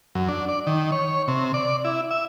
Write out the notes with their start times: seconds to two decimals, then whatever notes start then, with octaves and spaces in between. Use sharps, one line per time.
0.15 F#2
0.29 D4
0.48 D5
0.67 D#3
0.92 C#5
1.28 C3
1.54 D5
1.85 E4
2.11 E5